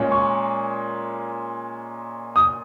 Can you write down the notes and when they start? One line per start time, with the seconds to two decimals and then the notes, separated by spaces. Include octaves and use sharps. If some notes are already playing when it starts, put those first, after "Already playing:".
Already playing: A#2 G#3 C#4
0.12 C#6
2.36 D#6